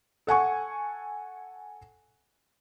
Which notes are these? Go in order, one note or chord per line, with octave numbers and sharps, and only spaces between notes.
A4 F#5 G#5 C#6